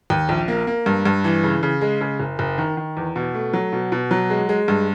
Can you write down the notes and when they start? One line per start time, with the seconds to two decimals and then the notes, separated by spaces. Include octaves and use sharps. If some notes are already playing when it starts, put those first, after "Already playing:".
0.10 D#2
0.29 A#1
0.48 A#3
0.67 A#3
0.86 G2
1.06 G2
1.24 E3
1.43 C#3
1.63 C#3
1.81 G#3
2.01 C#3
2.20 F#1
2.39 F#1
2.58 D#3
2.77 D#3
2.97 E2
3.16 B2
3.34 A3
3.53 F#3
3.72 B2
3.92 B2
4.11 F#3
4.30 G#3
4.49 G#3
4.68 G2